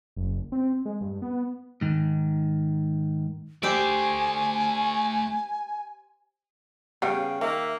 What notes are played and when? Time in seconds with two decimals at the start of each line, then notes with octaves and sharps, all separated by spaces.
0.16 F#1
0.52 C4
0.85 G#3
1.01 G2
1.22 B3
1.81 G#2 D#3
3.63 A3 G4 C5 D5 E5 G#5
7.02 C#3 G3 B3 F5 G5
7.41 D#3 A#3 E5